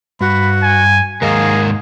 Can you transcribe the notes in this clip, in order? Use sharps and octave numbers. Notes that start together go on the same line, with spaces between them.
G2 F#4 B5
G#5
D#2 G#2 G#4 A#4 F5